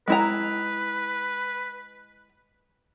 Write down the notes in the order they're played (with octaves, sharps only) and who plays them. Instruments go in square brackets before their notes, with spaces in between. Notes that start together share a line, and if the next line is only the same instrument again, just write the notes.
[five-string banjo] G#3 E4 A#5 [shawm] B4